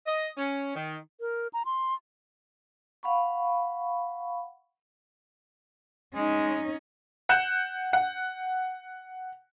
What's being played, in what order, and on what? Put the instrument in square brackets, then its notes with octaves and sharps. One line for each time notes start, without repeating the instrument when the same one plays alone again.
[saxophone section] D#5
C#4
D#3
[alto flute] A#4
A#5
C6
[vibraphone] F5 F#5 B5 C#6
[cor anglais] G#3 [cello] C#4 D#4
[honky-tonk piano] F#5 F#6 G6 C#7 E7
F#5